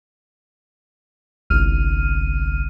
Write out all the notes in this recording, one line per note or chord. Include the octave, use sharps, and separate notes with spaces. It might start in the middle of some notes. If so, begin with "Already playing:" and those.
G1 C2 F6 D#7